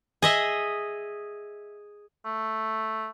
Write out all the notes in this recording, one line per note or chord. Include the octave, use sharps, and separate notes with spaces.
G#4 D#5 E5
A3